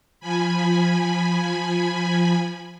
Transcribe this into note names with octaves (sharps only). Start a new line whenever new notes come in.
F3 G#5 B5